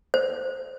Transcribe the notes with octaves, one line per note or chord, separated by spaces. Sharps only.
C5